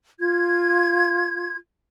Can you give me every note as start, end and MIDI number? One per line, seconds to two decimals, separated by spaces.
0.20 1.56 65
0.20 1.56 92